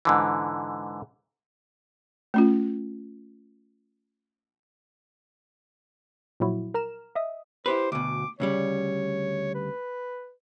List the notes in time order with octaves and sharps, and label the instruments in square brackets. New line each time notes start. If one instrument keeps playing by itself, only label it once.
[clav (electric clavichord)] G#2 D3 E3
[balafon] A3 C#4 F4
[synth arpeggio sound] A#2 F3 F#3 E4 F#4
A#4 A#5 F6 E7
D#5 E5 D#6
[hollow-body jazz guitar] E4 G4 B4 [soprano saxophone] C5
[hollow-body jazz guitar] D2 B2 [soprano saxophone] D6
[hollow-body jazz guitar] D2 C#3 G3 [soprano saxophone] C#5
[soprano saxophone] B4